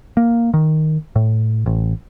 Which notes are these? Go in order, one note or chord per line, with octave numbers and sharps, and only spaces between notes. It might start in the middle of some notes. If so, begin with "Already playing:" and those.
A#3
D#3
A2
A1